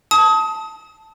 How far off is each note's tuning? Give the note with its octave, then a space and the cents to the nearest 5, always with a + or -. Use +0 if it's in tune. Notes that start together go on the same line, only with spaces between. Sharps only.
A5 +0 D#6 +30